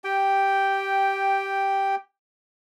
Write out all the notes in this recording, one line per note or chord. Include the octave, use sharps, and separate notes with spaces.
G4 G5